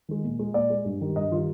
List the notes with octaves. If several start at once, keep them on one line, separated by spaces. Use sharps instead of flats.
D#3 G#3
A#2
G#3
A#2 D5
G#3
G2
D#3 G3
G2 D#5
D#3 G3 F4